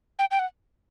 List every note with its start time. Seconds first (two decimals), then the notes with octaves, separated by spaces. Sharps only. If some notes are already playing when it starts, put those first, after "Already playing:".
0.19 G5
0.31 G5
0.39 F#5